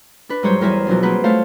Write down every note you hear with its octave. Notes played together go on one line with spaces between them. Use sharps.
D4 B4
G#2 F#3 G3 C5 C#5 G6
E2 G3 A#4 C5 E5 G#5
B2 F3 F#3 D4
A#3 C4 F#4 G#4 B4 C5
A3 C5 C#5 F5 A5